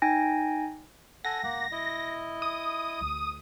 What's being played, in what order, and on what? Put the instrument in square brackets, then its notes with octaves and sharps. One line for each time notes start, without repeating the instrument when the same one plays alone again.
[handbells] D#4 G5 G#5 A#6
[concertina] A4 F#5 G#5 [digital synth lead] A#6
[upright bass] E1 [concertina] A#3 F#5
[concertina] E4 D#5
[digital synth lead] D#6
[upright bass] D2